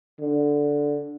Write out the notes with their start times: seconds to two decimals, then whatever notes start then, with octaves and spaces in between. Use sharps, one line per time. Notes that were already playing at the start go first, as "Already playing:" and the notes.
0.21 D3